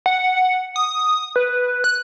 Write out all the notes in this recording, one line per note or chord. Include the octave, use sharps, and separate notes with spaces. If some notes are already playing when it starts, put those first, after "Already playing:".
F#5
D#6
B4
F#6